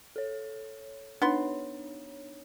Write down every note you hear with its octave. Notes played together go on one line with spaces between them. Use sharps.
A4 C#5
B3 D4 D#4 C#5 C6